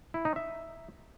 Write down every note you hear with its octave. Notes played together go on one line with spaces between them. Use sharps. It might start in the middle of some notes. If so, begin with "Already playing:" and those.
E4
D#4
E5